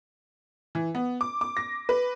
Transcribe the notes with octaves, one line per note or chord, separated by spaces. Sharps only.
E3
B3
D6
D6
A#6
B4